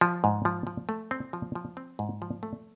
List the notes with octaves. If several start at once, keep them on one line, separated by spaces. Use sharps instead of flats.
F3
G#2
F3
F3
A3
C4
F3
F3
C4
G#2
F3
A3